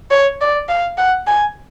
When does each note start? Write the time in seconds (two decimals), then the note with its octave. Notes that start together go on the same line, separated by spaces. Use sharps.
0.11 C#5
0.41 D5
0.69 F5
0.98 F#5
1.27 G#5